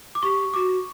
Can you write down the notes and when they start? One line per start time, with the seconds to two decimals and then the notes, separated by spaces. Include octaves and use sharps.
0.15 D6
0.22 G4 C#6
0.54 F#4 D6